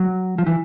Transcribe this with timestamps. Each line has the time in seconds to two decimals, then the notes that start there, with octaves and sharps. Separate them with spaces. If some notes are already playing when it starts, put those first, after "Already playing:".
Already playing: F#3
0.38 F3
0.47 E3